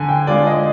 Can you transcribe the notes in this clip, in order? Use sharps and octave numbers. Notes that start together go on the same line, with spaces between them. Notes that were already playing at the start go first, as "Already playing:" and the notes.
Already playing: D3 G#5
G5
G#3 D4 F4 D5
D#5